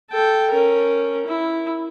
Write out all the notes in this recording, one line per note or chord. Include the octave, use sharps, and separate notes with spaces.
A4 G5
C#4 A#4
E4